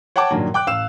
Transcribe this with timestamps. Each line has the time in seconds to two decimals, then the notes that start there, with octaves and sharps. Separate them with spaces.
0.16 C#5 F#5 G5 A5 D6
0.31 G2 A#2 D#3 F#3
0.54 G5 D6 F#6
0.67 A1 F5 E6 E7